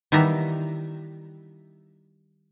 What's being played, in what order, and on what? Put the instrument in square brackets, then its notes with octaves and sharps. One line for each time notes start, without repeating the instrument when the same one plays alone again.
[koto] D#3 E3 G3 B3 E5 A#5